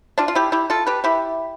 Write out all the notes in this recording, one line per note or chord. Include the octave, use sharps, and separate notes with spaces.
D4 F4
F4
E4 G4
E4 G4
F4 A4
G4 B4
E4 G4